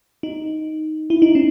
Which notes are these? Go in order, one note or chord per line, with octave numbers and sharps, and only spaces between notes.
D#4
E4
D#4
C#4